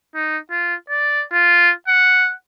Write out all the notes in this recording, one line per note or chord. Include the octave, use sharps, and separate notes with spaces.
D#4
F4
D5
F4
F#5